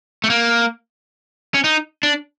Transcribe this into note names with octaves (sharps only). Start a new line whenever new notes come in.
A3
A#3
C#4
D#4
D4